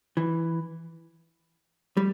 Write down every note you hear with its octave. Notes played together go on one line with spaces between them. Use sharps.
E3
G3